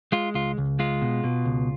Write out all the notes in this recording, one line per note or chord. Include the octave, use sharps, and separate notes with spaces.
G#3 F4
C#2 F4
C#2
G#3 F4
B2
B2
C#2